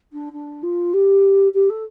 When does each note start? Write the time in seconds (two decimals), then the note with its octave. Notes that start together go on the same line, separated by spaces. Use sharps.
0.12 D4
0.32 D4
0.63 F4
0.93 G4
1.54 G4
1.69 A4